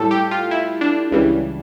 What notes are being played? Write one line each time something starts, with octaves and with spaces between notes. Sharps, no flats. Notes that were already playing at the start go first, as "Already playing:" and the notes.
Already playing: A2 G3 A4
G4
F4
E4
D4
C#2 C#3 E3 G3